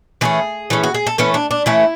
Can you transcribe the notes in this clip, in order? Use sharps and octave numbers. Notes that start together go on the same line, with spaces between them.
E3 A3 C#4 G#4
E3 A3 C#4
F#4
G#4
A4
E3 A3 C#4 B4
D4
D4
E3 A3 C#4 E4